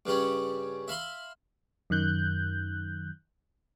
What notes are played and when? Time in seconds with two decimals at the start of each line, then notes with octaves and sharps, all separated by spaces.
0.06 G2 C#3 G3 C#4
0.88 E5 F5 B5 C6
1.90 F#2 D#3 F#6 G6